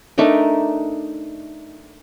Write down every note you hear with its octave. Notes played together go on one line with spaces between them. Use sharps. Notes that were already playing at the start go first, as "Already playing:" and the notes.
A3 D4 D#4 A#4